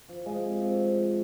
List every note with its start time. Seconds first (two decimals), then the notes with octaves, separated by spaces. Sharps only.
0.09 F3
0.26 F3 G#3
0.44 C3
0.61 C3
0.80 F3
0.97 F3